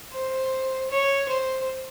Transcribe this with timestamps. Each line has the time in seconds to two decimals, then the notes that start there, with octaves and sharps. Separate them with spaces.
0.13 C5
0.90 C#5
1.29 C5